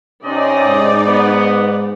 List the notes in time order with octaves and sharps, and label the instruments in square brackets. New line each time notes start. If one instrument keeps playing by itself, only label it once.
[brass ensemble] C3 C#4 D#5 [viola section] D#4 D5
[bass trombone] G#2
[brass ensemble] B3